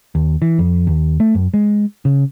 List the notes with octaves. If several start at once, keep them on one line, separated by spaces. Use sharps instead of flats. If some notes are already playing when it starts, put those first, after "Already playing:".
D#2
E3
F2
D#2
A3
F#2
G#3
C#3